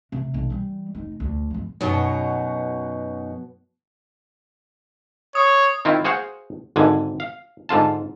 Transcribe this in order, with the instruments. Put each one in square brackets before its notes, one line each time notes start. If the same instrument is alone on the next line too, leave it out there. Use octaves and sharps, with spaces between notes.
[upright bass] C3
B1 D4
E3 G3
F1 D#4
D2
G#1 F3
[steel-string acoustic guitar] F#2 D#4 [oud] B2 F#3
[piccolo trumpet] C#5 [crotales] D#6
[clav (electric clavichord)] D#3 C4 E4 F4
F#4 G#4 C5 F5 F#5
G#1 G#2 D3 G#5
F5
G#2 D3 F4 A5